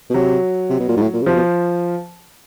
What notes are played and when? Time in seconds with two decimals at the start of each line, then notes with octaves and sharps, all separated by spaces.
0.10 B2
0.14 C3 F#3
0.70 C3
0.80 B2
0.89 A#2
0.97 G#2
1.02 A2
1.14 A#2
1.22 C#3
1.26 C3 F3
1.36 B2